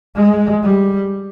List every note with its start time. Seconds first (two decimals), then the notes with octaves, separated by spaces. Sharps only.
0.16 G#3
0.63 G3